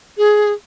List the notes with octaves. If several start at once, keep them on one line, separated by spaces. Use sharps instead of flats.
G#4